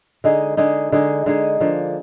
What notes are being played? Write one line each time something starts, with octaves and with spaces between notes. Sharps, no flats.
D3 G#3 D#4 G#4
D3 G#3 D#4 G#4
D3 G#3 D#4 G#4
D3 G#3 D#4 G#4
D3 F3 A#3